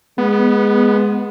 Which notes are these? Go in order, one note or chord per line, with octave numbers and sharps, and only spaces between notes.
G#3 B3